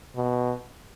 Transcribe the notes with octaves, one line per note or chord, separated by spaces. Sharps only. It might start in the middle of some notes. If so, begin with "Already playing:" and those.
B2